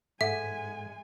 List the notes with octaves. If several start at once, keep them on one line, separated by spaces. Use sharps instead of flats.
G#2 G#3 A4 E5 F#5 G#5